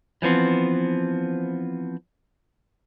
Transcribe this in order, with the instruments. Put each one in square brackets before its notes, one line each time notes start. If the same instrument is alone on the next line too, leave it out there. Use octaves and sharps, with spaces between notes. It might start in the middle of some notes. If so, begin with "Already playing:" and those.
[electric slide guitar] E3 F3 B3 C4